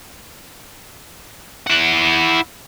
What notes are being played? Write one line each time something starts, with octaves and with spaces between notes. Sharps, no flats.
E4 F#5